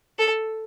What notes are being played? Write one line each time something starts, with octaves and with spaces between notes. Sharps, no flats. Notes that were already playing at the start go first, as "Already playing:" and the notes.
A4